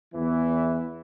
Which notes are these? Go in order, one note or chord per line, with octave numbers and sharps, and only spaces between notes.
E2 E3